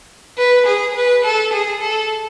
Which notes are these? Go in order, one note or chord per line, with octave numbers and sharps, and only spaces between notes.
B4
G#4
B4
A4
G#4
A4